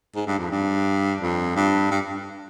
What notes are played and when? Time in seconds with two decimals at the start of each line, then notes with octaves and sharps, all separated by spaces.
0.16 G#2
0.27 G2
0.38 F2
0.51 G2
1.21 F2
1.56 G2
1.91 G2